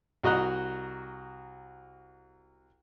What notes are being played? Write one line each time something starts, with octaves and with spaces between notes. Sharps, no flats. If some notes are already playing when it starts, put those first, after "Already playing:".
C2 F#4 D#5 A#5 F#6